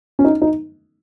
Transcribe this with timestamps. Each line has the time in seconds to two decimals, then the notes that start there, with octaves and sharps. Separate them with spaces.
0.19 C#4
0.25 D#4
0.42 D#4